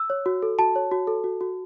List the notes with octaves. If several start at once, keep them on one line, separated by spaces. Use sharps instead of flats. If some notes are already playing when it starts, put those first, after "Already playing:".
Already playing: E6
C#5
F#4
A4
F#4 A5
C#5
F#4
A4
F#4
F#4